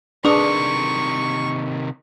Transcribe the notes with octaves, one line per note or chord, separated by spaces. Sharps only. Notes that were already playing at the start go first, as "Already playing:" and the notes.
C3 D#3 D4 G#4 B4 C#6 D#6